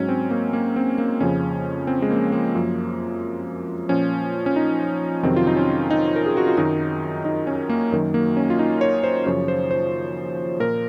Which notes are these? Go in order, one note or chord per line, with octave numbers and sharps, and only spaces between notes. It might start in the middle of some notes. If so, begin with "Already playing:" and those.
Already playing: G#2 F#3 C#4
C4
A#3
A#3
C4
A#3
F2 C#3 F3 C#4
C4
G#3
A#3
A#3
F#2 F3
A#2 F3 C#4
C#4
D#4
F2 C3 D#3 F#3 C4
F4
D#4
C#4
D#4
A#4
G#4
F#4
F4
F#2 D#3 F#3 D#4
D#4
C#4
A#3
F#2 D#3 F#3
A#3
C#4
F4
D#4
C#5
C5
F#2 C#3 F3 C#5
C5
C5
A#2 F3 A#4